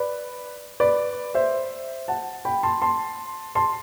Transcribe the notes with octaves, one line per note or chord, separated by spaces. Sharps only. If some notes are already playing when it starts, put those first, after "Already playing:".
Already playing: B4 D5
B4 D5
C5 E5
F#5 A5
G5 B5
A5 C6
A5 C6
A5 C6